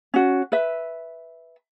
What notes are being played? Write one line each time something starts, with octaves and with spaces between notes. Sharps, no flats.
C#4 F#4
B4 E5